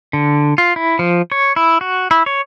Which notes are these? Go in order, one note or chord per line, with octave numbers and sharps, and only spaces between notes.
D3
F4
E4
F3
C#5
E4
F#4
E4
C#5